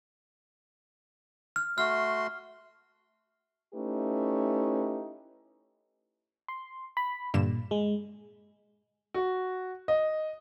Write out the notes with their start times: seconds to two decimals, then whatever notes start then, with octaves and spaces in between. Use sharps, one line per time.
1.56 F6
1.78 A3 F#4 C6 F6
3.74 A3 C#4 D#4 E4 G4 B4
6.48 C6
6.97 B5
7.34 G2 A#2 D3 E7
7.71 G#3
9.14 F#4
9.88 D#5